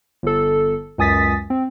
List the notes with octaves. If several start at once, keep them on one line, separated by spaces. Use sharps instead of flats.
G1 A4
C#2 F#2 G#5 D#6 A6 B6
C4